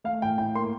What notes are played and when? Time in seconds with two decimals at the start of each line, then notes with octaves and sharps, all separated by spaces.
0.04 A3 F5
0.22 A2 G5
0.38 A2 G5
0.55 A#3 C6